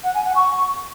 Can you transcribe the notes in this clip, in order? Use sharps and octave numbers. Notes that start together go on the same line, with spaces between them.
F#5
G#5
F#5
C#6